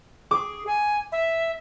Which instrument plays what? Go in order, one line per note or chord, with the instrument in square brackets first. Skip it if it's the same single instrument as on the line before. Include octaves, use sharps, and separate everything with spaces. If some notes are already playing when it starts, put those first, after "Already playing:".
[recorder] G#4 [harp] D6
[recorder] G#5
E5